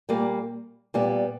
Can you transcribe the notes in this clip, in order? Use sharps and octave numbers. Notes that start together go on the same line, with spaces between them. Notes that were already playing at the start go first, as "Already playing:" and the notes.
A#2 G3 A#3
A#2 G3 B3